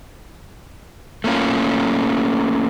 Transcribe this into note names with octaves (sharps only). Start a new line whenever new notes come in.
A3 A#3 C#4 F4